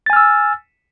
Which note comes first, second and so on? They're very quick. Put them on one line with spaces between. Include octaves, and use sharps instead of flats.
A6 G#5 F6 E6